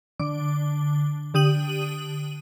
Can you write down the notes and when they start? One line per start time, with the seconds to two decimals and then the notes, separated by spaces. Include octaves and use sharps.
0.20 D3 D6
1.34 D3 G4 D#6 D#7 F#7